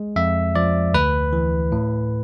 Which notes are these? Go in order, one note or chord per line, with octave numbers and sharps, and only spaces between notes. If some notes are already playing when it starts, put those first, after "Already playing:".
Already playing: G#3
F2 E5
F3 D5
D2 B4
E3
A2